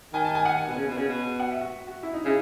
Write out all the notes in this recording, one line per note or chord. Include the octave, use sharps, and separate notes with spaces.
D#3 G#5
A5
G#5
F#5
B2
C#3
B2
C#3
B2
F#5
E5
F#4
F#4
E4
D#4
C#3 E4